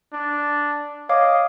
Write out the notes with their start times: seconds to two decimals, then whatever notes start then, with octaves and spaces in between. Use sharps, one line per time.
0.13 D4
1.09 C#5 D#5 F5 D6